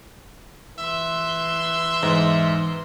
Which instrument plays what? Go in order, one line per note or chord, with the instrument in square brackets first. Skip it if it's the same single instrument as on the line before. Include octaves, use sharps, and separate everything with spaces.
[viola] E3 C6 [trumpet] E5
[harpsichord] E2 [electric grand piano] G#2